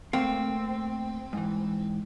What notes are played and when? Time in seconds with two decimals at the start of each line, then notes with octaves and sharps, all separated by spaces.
0.13 A3 A#3 C4 F5
1.33 G#2 E3